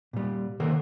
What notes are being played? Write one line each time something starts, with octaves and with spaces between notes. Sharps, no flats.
A#2 G3
D3 D#3 A#3 A4 A#4